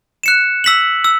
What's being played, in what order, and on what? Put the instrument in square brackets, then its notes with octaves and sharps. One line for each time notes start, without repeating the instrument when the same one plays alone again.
[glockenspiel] F#6 C#7 E7
E6 B6 F#7
E6